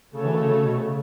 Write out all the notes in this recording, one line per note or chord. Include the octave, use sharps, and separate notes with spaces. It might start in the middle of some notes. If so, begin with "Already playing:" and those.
C#3 A3 F#4 A4 C#5
E3
C#3
C#3
B2
C#3